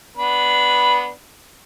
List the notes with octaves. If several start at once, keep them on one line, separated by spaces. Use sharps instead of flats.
B3 D4 B4